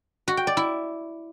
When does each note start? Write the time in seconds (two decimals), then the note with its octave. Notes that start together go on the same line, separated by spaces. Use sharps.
0.28 F#4
0.37 G5
0.47 D5
0.57 E4